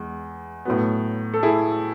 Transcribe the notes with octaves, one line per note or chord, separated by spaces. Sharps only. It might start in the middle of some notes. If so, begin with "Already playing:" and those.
Already playing: E2 G#3
A2 F#3 B3
A4
E4 G#4